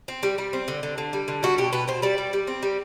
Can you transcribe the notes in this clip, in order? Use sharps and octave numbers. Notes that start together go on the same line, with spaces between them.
C4
G3
G3
C4
D3
D3
D3
G3
D3
G3 F#4
B2 G4
B2 B4
B2 C5
G3 D5
G3
G3
C4
G3